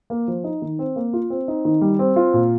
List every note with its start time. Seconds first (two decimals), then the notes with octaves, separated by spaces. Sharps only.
0.10 A#3
0.28 F3
0.44 D#4
0.62 D#3
0.79 C4
0.96 A#3
1.13 F4
1.30 C4
1.48 D#4
1.65 D#3
1.81 G3
1.99 C4
2.16 F4
2.33 A#2